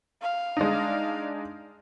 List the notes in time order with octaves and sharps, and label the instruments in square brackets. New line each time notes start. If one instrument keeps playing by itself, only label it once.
[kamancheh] F5
[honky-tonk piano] G#3 D4 D#4